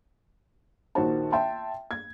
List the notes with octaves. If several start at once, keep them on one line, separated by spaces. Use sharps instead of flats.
A#1 D#3 F#4 C5 A5
E5 G5 A5 C6
G#6